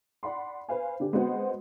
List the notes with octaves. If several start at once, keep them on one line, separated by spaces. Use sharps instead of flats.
D5 F#5 B5 C6
B4 C5 F5 G#5
D3 D4 G4
G#3 B3 C4 F#4 C5 F#5